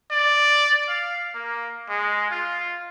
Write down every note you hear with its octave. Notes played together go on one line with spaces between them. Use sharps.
D5
F5
A#3
G#3
F4